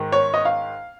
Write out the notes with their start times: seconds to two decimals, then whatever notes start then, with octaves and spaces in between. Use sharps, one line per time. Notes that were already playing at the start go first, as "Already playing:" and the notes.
Already playing: G#2 D#3
0.12 C#5
0.34 D#5
0.45 F5